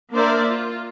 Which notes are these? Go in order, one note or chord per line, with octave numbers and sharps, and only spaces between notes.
A#3 D4 A#4 C5 D5 E5
F4